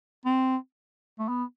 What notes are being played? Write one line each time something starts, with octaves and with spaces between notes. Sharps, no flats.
C4
A3
B3